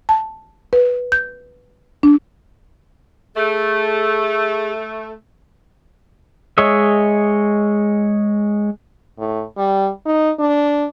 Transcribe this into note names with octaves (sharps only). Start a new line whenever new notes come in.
A5
B4
G6
D4
A3 G#4
G#3 G#4 C#5 D#5 E5
A2
G3
D#4
D4